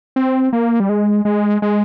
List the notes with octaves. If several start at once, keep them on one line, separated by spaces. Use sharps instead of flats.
C4
A#3
G3
G#3
G#3
G#3